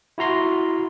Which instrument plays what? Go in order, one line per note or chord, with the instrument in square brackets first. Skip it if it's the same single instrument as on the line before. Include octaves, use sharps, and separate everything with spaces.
[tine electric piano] E4 F#4 A#5 C6